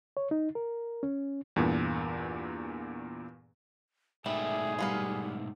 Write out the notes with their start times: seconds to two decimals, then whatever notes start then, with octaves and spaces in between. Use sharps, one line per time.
0.17 C#5
0.31 D#4
0.55 A#4
1.03 C#4
1.56 E2 G2 A#2
4.26 G#2 B2 G3 A3 G#4 E5
4.79 G3 A#3 B3 F4